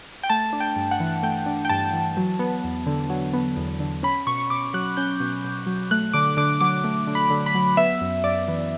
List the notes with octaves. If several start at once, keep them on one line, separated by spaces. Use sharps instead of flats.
G5
A3 A5
D4
G5
G2
F#5
E3
A3 G5
D4
G5
G2 A5
E3
F#3
B3
E2
D3
F#3
B3
E2
D3
C#4 B5
B2 C#6
B2 D6
F#3 F#6
C#4 G6
B2
B2
F#3
A3 F#6
D3 D6
D3 D6
F#3 D6
A3
D3
B5
D3
B5
F#3
B3 E5
F#2
F#2 D5
E3